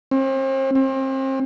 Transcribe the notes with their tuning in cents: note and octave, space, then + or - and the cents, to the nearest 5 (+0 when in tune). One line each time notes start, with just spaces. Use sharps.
C4 +40
C4 +35